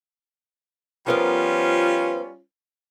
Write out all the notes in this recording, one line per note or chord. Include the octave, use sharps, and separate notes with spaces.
F3 G3 B3 C#4 F4 A#4